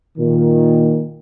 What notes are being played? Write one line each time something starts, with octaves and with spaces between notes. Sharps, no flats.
A#2 D#3